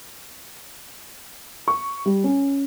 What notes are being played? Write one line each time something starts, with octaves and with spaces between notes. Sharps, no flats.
C#6
G3
C#4